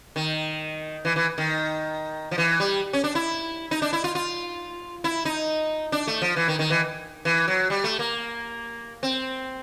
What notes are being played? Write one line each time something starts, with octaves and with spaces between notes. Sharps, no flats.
D#3
E3
E3
D#3
F3
E3
G3
C#4
D4
E4
D#4
D4
E4
F4
F4
E4
D#4
D4
A3
F3
E3
D#3
D#3
E3
E3
F#3
G3
A3
A#3
C4